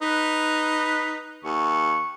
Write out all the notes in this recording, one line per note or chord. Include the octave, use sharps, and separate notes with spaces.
D#4 B4
D#2 C#6